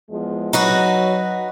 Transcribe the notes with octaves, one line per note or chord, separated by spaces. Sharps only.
E2 F3 G#3
F#3 D#4 F#4 B4